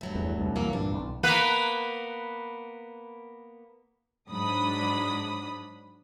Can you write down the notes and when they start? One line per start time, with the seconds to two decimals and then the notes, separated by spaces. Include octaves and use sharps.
0.01 G2 F#3 A3
0.15 E2
0.39 C2 F2
0.56 E3 F#3 A#3
0.73 G2 A#2 E3 D4
0.91 E1 B1
1.23 A#3 B3 B4
4.30 G#2 F#3 D4 B5 D#6